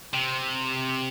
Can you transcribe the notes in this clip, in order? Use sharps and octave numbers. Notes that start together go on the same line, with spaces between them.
C3